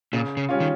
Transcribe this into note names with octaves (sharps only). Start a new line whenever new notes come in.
A#2 C#3
C#3
G3 C#4 F4
D#3